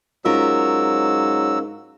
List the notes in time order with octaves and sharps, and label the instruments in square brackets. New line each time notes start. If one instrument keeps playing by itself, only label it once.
[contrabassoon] G#2 [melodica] F#3 E6 [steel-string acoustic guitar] C#4 F4 A#4